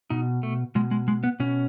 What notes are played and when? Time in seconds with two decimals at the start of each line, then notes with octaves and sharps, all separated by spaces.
0.10 B2 D#4
0.43 A3
0.75 B2 G#3
0.91 G#3
1.08 G#3
1.24 B3
1.40 B2 C#4